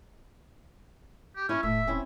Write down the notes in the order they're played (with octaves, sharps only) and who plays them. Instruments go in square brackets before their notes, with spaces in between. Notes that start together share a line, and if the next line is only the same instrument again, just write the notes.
[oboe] G4
[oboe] C#4 [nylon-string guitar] E4
[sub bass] E1 [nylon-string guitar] A2 [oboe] E5
[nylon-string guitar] C4 C#4 E4